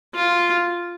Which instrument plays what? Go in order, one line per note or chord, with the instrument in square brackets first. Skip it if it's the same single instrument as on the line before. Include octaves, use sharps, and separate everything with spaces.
[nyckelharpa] F4